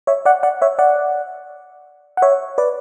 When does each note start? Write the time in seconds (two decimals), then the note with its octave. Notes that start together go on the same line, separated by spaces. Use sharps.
0.07 C#5 E5
0.25 D5 F#5
0.43 D5 F#5
0.61 C#5 E5
0.79 D5 F#5
2.17 F#5
2.22 C#5 E5
2.58 B4 D5